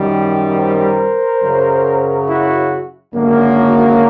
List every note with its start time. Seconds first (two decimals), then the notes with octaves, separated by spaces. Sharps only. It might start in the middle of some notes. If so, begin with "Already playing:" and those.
Already playing: F#2 D#3 G3
0.57 A#4 C5
1.42 F#2 C#3 F#3
2.28 E4 F#4
3.13 G#1 F#2 D3 F#3 A#3